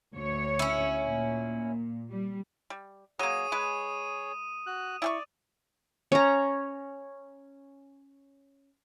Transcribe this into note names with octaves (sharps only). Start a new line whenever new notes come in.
D2 C#5
C#4 E4
A#2
G3
G3
F#3 A#3 G#4 C#5 D#6 D#7
G#3 B4
F#4 F#6
E4 D5 G5 C#6
C#4 A#5